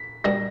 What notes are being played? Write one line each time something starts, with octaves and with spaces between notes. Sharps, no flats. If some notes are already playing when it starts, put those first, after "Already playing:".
Already playing: B6
B2 G3 A#3 D4 A#6